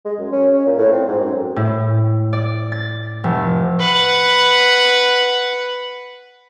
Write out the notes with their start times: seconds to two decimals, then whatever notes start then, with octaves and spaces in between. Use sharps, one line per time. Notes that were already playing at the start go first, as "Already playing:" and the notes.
0.06 G#3
0.20 F#2
0.32 C#4
0.53 C#4
0.66 A#2
0.78 A2
0.93 C4
1.08 G#2
1.19 F#2
1.56 A2
2.33 D5
2.72 A6
3.24 F1
3.80 B4 F#5